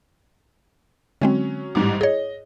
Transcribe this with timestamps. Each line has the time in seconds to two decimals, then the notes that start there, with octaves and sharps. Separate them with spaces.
1.21 D3 F#3 G#3 C4 C#4
1.75 A1 G#2 G3 D6
2.01 G#4 C#5 D#5